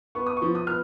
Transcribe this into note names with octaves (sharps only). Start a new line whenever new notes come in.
B3 C#6
D#6
C#6
F3
D#6
B3 F6